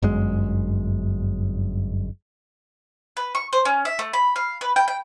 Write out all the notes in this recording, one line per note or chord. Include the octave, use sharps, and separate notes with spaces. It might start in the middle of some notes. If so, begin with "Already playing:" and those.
G1 F#2 G#3
B4
C#6
C5
C#4
E5
A3
B5
F5
B4
G5
G5